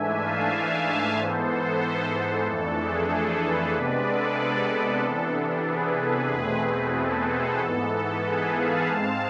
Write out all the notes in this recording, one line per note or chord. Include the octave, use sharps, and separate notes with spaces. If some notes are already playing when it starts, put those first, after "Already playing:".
Already playing: G#2 E3 A3 D4 E5 G#5
F5 A5
E5 G#5
G#2 E3 B3 A4 C5
F2 E3 A3 D4 A4
G#4
A4
G#4 B4
C3 G#3 B3 D4 B4 D5
A4
A4
C3 E3 B3 D4
G#4 B4
E2 B2 A3 C4
A4
G#4
G#2 E3 B3 A4
G#4 B4
F5 A5
G#2 G#3 C4 F5 A5